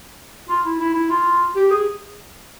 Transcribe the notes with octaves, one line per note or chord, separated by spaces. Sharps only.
F4
E4
E4
E4
F4
G4
G#4